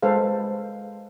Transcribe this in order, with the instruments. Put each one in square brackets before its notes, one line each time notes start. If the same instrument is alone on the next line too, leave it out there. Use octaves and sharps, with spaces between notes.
[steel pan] G#3 A4 B4 C5 F5